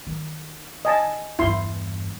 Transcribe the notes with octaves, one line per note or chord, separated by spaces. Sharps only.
D#3
D#5 G#5 A5
E2 G2 E4 C6